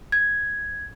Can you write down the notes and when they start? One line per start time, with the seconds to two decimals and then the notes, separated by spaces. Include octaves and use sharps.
0.12 G#6